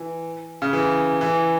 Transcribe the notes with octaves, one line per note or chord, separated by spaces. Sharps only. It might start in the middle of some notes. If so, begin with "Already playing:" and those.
Already playing: E3
C#3
E3
E3